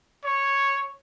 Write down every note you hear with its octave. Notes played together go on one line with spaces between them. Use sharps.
C#5